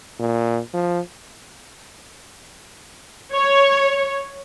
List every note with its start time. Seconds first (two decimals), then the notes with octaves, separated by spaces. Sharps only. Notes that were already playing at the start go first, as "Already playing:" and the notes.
0.20 A#2
0.74 F3
3.33 C#5